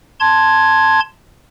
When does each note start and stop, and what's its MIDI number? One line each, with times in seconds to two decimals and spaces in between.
0.20 1.00 81
0.20 1.00 84
0.20 1.00 92